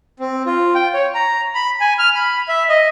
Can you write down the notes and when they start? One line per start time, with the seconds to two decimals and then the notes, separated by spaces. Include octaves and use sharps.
0.20 C4
0.46 F4
0.75 G5
0.93 C#5
1.15 A#5
1.55 B5
1.80 G#5
1.99 F6
2.15 B5
2.48 E5
2.69 D#5